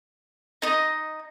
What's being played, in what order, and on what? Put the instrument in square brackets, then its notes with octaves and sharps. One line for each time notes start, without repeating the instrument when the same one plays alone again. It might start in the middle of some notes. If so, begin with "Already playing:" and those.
[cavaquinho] D#4 D#5